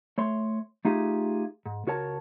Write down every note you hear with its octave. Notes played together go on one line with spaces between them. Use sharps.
A3 C#5 C6
A3 D#4 F4 G4 G#4
G#2
C#2 F#4 A#4 C#5 A5